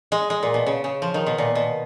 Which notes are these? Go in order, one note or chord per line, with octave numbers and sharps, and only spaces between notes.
G#3
G#3
A#2
B2
C#3
C#3
F3
D#3
B2
A#2
B2